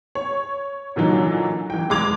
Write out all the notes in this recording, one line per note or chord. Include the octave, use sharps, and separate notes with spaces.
C#5
A#2 D3 E3 F#3 D#4
E3 G5
F1 G#3 C6 D6 G#6 F7